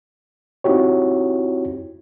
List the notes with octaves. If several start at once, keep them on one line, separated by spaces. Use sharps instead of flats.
C4 D#4 E4 F#4 G4 C#5